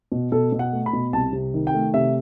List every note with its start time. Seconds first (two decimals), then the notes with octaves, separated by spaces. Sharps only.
0.12 B2
0.32 B2 A4
0.52 B2
0.59 F#5
0.73 A3
0.86 B5
0.93 B2
1.13 C2 A5
1.33 C3
1.54 D#3
1.67 G5
1.74 A3
1.94 C3 E5